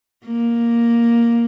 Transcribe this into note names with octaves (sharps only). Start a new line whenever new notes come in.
A#3